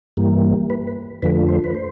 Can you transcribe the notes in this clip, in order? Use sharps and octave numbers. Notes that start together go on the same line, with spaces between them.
G2 E3 G3 A#3
B4
B4
F2 D3 F3 A3 B4
C5
B4
C5